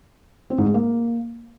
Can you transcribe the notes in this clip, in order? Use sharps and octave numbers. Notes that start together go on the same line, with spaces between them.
C4
G#2
G#3
A#3